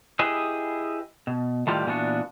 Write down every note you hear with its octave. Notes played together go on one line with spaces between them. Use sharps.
E4 G4 G#4 B4 D#5
B2
A2 D#3 G3 F4 G4
A#2 E3 B3 D4 F#4